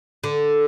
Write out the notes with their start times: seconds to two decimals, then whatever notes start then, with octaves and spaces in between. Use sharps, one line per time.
0.24 D3